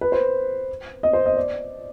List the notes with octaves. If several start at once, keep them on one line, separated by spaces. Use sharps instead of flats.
B4
C5
D#5
C5
D#5
D5